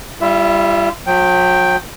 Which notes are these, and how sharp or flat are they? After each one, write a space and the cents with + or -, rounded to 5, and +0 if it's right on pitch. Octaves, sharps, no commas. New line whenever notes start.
G3 +0 F4 -45 E5 +0
F#3 -40 G5 +0